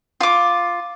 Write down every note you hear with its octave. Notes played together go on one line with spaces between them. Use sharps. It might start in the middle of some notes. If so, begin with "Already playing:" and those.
F4 D6